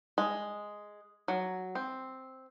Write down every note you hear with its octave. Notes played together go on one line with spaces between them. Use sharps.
G#3
F#3
C4